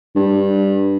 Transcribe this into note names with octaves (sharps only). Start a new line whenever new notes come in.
G2